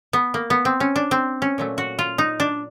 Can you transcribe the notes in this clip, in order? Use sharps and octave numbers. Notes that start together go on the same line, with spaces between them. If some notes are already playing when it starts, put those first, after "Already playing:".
B3
A#3
B3
C4
C#4
D4
C4
C#4
A#2 F#3 A3
F#4
F4
D#4
D4